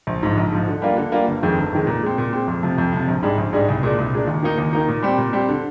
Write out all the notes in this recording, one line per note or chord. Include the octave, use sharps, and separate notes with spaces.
A#1
G#2 F3
A#1
G#2 F3
D3
G3 A#3 F4
D3
G3 A#3 F4
G1
F2 D#3 G#3
G1
F2 D#3 G#3
A#2
G#3 C4
A#2
G#3 C4
F2
C3 F3
F2
C3 F3
A#1
G#2 G3 D4 G#4
A#1
G#2 G3 D4 G#4
C2
A#2 G#3 D4
C2
A#2 G#3 D4
D#2
D#3 A#3 D#4
D#2
D#3 A#3 D#4
A#2
G3 C4 G4
A#2
G3 C4 G4
D3